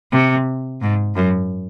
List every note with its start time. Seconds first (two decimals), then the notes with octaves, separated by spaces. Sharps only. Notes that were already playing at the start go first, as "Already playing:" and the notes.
0.12 C3
0.81 G#2
1.15 F#2